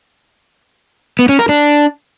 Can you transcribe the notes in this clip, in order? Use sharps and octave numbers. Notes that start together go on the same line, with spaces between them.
B3
C#4
A#4
D4